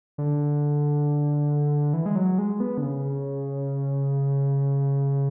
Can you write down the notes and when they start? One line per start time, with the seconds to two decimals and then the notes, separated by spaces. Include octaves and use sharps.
0.18 D3
1.94 E3
2.06 G#3
2.16 F#3
2.38 G#3
2.60 B3
2.78 D3
2.82 C#3